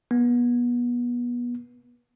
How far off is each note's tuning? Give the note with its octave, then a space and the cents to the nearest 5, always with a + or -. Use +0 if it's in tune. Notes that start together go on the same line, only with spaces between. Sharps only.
B3 -30